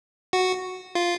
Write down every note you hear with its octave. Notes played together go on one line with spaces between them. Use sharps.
F#4
F4